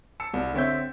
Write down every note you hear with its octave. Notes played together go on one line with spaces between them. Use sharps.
A5 E6 C#7
C2
D3 C4 C#5 E5 G6